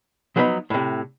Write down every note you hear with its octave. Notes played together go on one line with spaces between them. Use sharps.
F3 F#3 B3 D#4 D#5 B5
A2 C3